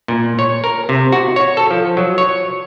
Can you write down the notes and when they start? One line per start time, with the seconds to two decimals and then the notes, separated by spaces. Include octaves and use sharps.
0.08 A#2
0.39 C#5
0.64 A#4
0.89 C3
1.12 F#4
1.36 C#5
1.57 A4
1.71 F3
1.97 F#3
2.18 C#5